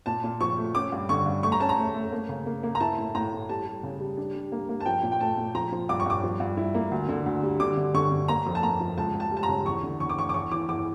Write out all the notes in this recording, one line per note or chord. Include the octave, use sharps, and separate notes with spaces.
A#2 A5
A#2
F3 C#6
A3
C#4 D6
G2
D3 C#6
G2
A3 C#6
A#5
C#4 A5
A#5
A3
A3
A#3
C#3
A#3
A#3
A#5
E4 A5
A2
A2 A#5
A2
G3 A5
G3
C#3
G3
D4
G3
A#3
A#3
A5
F3 G5
A#2
G5
A3 A5
A#2
F3 A#5
F3
G2 D6
C#6
G2 D6
F3
G2
E4
A#3
D2
D3
D2
G3
D3 D6
D3
D3 C#6
D3
A#3 A#5
F2
A5
A#3 A#5
F3
C#2 A5
C#2
A5
G3
A5
A#5
C#3
E2 C#6
D3
E2 C#6
D6
E2 C#6
D6
E2 C#6
E3 D6
E2 D6